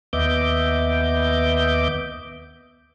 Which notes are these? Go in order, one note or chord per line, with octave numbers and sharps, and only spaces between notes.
D#2 B3 D#5 E5 D6 G6